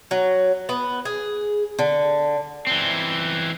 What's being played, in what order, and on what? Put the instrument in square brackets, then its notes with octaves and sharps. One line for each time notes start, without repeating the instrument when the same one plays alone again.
[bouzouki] F#3
B3
G#4
D3
[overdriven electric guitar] E3 C4